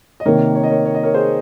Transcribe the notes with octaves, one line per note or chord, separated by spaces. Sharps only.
D#5
C3 D#3 A#3 A#4 C#5
C#5
D#5
A#4 C#5
C#5
D#5
A#4 C#5
G#4 C5